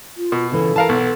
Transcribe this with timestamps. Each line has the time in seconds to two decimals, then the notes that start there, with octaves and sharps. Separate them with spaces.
0.17 F4
0.32 B2
0.52 C#3 E3 A4
0.76 E3 A#4 F5 A5
0.89 B1 B3